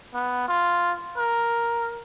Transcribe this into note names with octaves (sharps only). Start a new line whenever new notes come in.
B3
F4
A#4